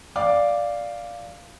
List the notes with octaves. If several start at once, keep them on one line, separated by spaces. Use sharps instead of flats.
D5 F5 D6